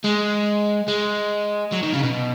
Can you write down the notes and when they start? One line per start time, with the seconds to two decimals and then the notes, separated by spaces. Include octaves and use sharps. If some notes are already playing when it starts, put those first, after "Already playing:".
0.04 G#3
0.88 G#3
1.72 F#3
1.83 D#3
1.94 C#3
2.03 B2